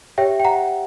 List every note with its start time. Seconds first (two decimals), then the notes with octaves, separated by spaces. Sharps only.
0.18 G4 C#5 E5 G5
0.40 G5
0.45 F#5 A#5